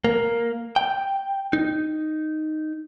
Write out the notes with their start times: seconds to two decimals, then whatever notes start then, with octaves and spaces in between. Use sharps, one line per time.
0.04 A#3
0.76 G5
1.53 D#4